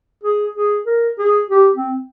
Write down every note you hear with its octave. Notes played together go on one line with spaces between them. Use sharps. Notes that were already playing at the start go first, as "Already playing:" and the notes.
G#4
G#4
A#4
G#4
G4
C4